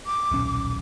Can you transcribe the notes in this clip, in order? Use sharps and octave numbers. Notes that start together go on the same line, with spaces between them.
D6
D#1 B1 C#4